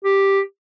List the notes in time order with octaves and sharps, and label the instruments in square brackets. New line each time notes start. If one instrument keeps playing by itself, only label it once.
[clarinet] G4